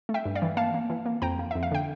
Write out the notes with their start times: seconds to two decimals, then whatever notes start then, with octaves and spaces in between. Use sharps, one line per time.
0.09 A3
0.14 E5 G5
0.25 G2
0.35 D5 F5
0.42 E3
0.57 A#3 F5 A5
0.74 A#3
0.90 E3
1.06 A#3
1.22 F2 G5 A#5
1.39 A#3
1.51 F2 E5
1.63 F5
1.71 D3 G5